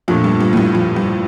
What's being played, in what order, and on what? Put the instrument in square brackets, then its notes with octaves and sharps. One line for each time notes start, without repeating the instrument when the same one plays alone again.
[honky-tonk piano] F2 [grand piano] A#2 A3 D4
[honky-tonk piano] G2
G2
A2
G2
F2
G2